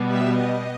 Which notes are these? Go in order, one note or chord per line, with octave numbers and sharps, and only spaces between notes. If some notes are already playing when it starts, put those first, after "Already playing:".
Already playing: B2 G3 B3
E5
D#5